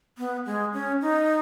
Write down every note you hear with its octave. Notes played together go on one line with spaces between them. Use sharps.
B3
G#3
C#4
D#4